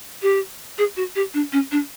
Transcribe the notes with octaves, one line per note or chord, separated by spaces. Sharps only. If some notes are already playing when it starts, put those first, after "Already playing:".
G4
G#4
F#4
G4
D4
C#4
D4